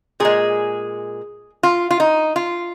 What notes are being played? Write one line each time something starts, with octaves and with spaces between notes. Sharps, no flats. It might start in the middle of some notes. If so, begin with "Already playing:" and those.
A#2 G#3 G#4
F4
F4
D#4
F4